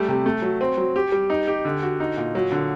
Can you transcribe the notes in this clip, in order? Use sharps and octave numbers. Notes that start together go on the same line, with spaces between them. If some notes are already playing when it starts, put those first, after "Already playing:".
Already playing: G3 A3
C3
A3
F#3
C4
F#3
G4
G3
D#4
G4
D3
F#4
D#4
A#2
F#3
D3